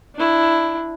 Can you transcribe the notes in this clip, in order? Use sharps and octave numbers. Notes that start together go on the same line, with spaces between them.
D4 E4